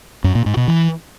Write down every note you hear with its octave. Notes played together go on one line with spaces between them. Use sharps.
F#2
A#2
G#2
B2
E3